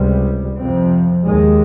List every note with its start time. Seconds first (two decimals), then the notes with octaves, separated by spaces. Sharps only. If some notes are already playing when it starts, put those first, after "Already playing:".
Already playing: C#2 C3 G3
0.58 F2 C3 F3 C4
1.26 D#2 D#3 G#3